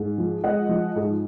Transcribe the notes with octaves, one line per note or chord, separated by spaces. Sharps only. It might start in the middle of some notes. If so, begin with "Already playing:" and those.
Already playing: G#2
F3
G#3 D#5 F#5
F3
G#2